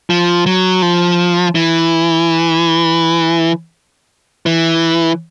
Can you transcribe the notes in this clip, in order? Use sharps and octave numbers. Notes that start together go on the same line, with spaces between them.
F3
F#3
F3
E3
E3